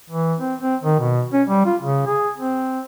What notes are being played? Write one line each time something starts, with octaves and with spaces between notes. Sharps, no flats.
E3
C4
C4
D#3
B2
C#4
G3
F4
C#3
G#4
C4